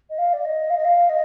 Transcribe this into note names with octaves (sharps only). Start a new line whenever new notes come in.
D#5
F5
D5
D#5
F5
D#5
F5
D#5